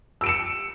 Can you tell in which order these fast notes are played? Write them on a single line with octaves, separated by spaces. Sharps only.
E6 D7 E7 C#7